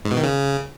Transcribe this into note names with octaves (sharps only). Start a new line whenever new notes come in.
G#2
B2
D#3
C#3